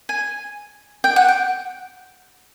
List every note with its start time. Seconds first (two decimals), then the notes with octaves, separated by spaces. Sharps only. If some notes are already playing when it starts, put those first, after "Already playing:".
0.09 G#5
1.04 G5
1.16 F#5
1.28 G5